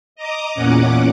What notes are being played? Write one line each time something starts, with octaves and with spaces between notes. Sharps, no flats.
D#5 A#5 D6 D#6
E2 A#2 C#4 F#5 D6